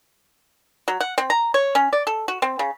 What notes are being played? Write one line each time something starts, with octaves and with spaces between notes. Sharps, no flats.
F#3
F#5
C4
A#5
C#5
C#4
D5
A4
F#4
C4
C#3